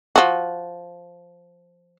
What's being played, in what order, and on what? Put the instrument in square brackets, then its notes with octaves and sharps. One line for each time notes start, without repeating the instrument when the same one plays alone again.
[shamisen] F3 F#4